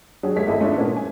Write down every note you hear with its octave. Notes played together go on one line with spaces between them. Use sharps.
F#3 D4 G4 G#4
D#2 G#3 A3 C#5 B6
G#1 E4 A4 D#5
G#3 A3 C#4 D4 E4 F4
A#2 A#3 B3 C#4 D4 F4
F#2 G#5